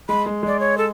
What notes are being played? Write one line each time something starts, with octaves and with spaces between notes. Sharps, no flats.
G#3 B5
G#3
G#3 D5
C#5
A4